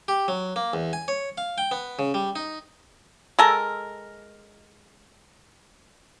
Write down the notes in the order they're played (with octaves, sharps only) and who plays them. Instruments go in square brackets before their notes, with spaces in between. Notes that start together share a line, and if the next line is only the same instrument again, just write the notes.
[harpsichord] G4
F#3
A#3
E2
G#5
C#5
F5
G5
B3
C#3
G3
D#4
[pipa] G#3 A4 A#4